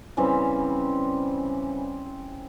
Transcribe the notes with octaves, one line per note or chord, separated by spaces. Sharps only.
C#3 E3 G3 C4